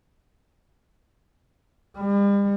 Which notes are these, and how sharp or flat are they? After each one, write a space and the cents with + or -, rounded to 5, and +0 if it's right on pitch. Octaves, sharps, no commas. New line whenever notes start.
G3 +40